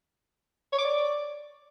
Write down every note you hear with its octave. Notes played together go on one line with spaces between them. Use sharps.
C#5
D6
D5